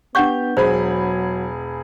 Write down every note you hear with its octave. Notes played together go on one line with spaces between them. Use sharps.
B3 D4 G4 F#5 C#6 G6
E1 F#3 G#4 C5 B5